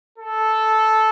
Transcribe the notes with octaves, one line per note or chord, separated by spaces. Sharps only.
A4